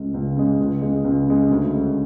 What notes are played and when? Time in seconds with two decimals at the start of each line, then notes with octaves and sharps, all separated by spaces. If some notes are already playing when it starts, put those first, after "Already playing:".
Already playing: C#2 C#3 G#3
0.14 C#2
0.37 C#3 G#3
0.59 C#2
0.82 C#3 G#3
1.04 C#2
1.27 C#3 G#3
1.50 D2
1.73 D3 G#3 C#4